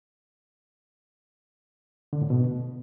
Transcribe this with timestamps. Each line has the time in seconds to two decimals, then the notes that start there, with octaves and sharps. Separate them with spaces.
2.13 D3
2.21 A2
2.30 B2